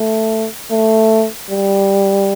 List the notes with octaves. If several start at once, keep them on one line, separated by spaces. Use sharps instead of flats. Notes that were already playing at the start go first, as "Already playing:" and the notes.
Already playing: A3
A3
G3